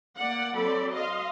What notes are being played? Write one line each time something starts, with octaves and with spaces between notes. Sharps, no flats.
A#3 D5 F#5
F#3 C4 A4 D5 B5
D#5 F5 C6